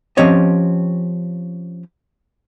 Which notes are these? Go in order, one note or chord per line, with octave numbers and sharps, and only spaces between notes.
F3 C4 C#4 G4 C#5 D#5